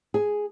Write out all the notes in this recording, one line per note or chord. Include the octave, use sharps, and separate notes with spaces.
G#4